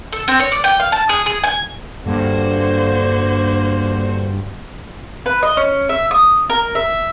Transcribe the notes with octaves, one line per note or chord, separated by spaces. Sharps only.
A4
C4
C#5
D5
G5
F5
A5
G#4
G#4
G#5
G2 D3 A#3 F#4 C5
B4
D#5
C#4
E5
D#6
A#4
E5